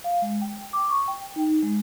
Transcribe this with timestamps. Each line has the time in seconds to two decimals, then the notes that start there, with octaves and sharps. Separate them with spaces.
0.04 F5
0.22 G#3
0.42 G5
0.73 D6
0.89 C#6
1.08 G5
1.36 D#4
1.62 G#3